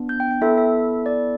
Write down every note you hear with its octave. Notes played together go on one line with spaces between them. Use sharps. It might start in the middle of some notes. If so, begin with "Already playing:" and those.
Already playing: B3 D4
G6
G5
G5
B3 E4 A4 E5
E5
D5